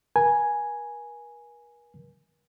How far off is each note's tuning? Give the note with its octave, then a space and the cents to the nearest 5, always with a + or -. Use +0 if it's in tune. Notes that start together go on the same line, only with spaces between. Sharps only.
A#4 +45 G#5 +0